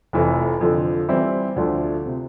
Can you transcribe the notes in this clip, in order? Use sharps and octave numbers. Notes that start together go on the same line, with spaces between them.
F1 F2 E3 A3
F2 D3 F3
E3 G3 C4 E4
D2 D3 F3 A3 D4
C3